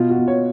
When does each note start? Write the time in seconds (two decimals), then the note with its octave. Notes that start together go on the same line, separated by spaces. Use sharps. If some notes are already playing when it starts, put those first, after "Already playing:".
Already playing: B2 F4
0.10 F#4
0.19 B2
0.28 C#5